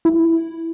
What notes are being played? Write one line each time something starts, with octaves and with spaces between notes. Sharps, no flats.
E4